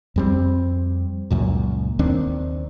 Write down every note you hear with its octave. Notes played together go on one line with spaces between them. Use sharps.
F2 G3 C4
C#2 F#2 A#2
D#2 D#3 C4 D4